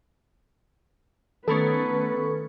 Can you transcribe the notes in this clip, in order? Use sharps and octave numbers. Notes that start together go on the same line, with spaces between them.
D#3 A3 B3 C#4 A4 B4 B5 C#6